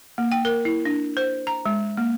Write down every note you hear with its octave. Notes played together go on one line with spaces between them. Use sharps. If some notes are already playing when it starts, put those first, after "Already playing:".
A#3
G5
A#4
E4
D4
C5
A#5
G#3
A#3